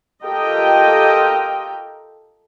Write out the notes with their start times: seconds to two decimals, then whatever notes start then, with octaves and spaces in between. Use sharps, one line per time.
0.23 F4 G4 A4 A#4 D#5 G5